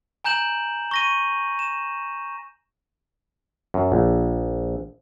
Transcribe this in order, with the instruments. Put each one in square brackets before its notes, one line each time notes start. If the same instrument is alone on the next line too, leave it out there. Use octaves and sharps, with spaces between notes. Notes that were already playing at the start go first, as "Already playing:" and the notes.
[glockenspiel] G#5 A#5 G6 E7 F#7
C#6 A#6 D#7
E7
[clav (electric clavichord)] F#2
A#1